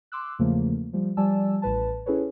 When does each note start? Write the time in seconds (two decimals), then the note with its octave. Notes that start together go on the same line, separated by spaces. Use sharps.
0.12 C6 D6 E6 F#6
0.39 E2 C#3 F3 A3 A#3
0.93 F3 G3
1.17 F3 G3 D5 G#5 A5 E6
1.62 A1 A2 B4 A5
2.06 C#4 E4 G#4 A4 B4 C#5